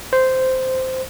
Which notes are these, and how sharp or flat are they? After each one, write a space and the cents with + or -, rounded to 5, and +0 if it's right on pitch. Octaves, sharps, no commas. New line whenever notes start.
C5 -10